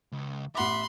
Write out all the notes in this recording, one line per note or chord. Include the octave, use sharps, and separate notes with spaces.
C#2
A1 E5 F#5 B5 C6 D6